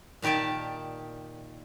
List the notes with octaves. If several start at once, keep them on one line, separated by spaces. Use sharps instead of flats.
A#2 D#3 G4 D5 A5